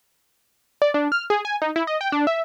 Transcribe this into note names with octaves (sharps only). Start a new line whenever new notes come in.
D5
D4
F6
G#4
G#5
D#4
E4
D#5
G5
D4
E5